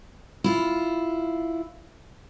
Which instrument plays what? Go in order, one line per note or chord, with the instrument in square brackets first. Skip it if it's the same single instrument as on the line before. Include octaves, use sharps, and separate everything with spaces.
[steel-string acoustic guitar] E4 F4